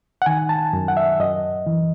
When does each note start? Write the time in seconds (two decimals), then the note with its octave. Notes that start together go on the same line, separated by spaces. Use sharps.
0.22 F#5
0.26 D#3 G#5
0.49 A5
0.73 F#2
0.88 F#5
0.97 E5
1.20 F#2 D#5
1.66 E3